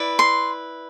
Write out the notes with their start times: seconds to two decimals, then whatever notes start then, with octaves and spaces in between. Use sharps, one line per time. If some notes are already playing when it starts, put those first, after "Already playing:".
Already playing: E4 B4 D5
0.19 C6